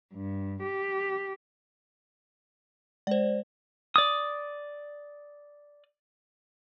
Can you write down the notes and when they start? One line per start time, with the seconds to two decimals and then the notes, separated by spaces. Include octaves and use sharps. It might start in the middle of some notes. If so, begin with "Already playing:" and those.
0.14 G2
0.63 G4
3.07 G#3 C5 D5
3.96 D5 D#6